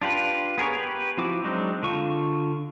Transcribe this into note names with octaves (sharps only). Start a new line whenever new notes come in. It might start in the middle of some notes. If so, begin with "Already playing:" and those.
D4 F4 G4 B4
B3 G#4 A#4 C#5
G4 B4
F3 C4 E4 F#4 D6
F#3 G#3 C4 D4 D#4
D3 D4 F4 C#6